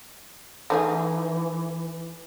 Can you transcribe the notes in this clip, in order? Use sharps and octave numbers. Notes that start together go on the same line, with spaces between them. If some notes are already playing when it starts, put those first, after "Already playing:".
E3 A3 D#4 G#4